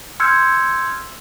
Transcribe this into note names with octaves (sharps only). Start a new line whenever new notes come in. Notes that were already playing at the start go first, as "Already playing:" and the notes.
C6 E6 F6 G6 G#6 C#7